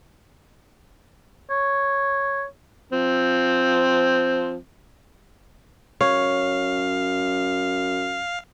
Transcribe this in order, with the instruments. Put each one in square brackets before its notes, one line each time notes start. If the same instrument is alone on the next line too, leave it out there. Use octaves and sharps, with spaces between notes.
[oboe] C#5
[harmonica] F3 C4
[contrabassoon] F#2 [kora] C#5 [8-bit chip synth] F5